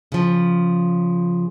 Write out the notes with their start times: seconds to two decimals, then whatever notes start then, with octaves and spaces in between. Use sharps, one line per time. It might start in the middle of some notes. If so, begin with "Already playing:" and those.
0.12 C#3 F3